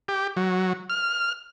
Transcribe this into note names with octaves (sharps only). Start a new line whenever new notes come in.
G4
F#3
F6